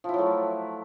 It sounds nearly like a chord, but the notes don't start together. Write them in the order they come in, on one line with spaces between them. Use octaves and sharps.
F3 E4 F#3 A3